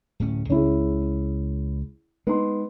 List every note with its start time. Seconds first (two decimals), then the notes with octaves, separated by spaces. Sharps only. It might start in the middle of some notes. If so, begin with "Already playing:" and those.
0.20 D1 A2 C#4
0.50 C#2 C#4 E4 G#4
2.27 G#3 B3 D#4 C6